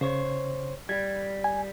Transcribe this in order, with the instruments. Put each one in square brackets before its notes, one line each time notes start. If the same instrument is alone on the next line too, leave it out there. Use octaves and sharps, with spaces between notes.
[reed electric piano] C#3 [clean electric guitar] C5 C#5
[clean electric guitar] G3 [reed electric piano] G#6
[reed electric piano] G#5